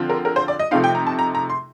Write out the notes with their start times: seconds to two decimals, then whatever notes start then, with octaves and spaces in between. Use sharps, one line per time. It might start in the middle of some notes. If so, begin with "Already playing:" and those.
Already playing: D3 F3 C4 F4
0.10 A#4
0.25 A#4
0.36 C5
0.48 D5
0.59 D#5
0.71 C3 F3 A3 C4 D#4 F5
0.84 G5
0.95 A#5
1.07 A5
1.19 A#5
1.35 A#5
1.50 C6